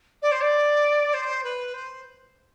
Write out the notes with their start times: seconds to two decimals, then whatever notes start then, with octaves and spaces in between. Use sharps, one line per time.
0.22 D5
0.32 C5
0.41 D5
1.14 C5
1.44 B4
1.74 C5